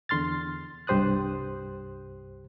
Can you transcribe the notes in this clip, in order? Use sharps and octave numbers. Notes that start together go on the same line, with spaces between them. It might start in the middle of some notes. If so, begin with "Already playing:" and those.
E2 D3 C6 F6 A6
C2 G2 G4 C5 D#6 F#6